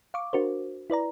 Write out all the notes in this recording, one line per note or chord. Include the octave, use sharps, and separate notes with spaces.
F5 C#6 D6
D4 F#4 A#4 C5
E4 B4 D5 A#5